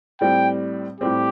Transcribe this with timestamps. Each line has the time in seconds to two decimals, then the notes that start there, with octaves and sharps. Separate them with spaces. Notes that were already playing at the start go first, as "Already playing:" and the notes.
0.21 A2 G3 C4 G5
1.00 A2 G3 C4 G4